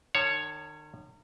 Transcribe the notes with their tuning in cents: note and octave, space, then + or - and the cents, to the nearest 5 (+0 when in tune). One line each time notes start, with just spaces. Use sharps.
D#3 -45 C#5 +0 A5 +0